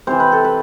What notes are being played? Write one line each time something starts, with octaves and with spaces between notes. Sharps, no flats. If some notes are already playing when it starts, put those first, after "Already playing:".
C3 E3 C5
B4
A4
B4